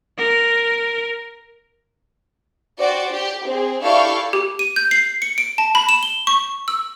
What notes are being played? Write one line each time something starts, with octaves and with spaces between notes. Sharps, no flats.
A#4
F#4 C5 D5 G5
G4
C4 G#4
E4 G4 A4 D5 F5 C#6
G4
D#7
G6
C7
C#7
D7
A5
B5
E7
G7
C#6
E6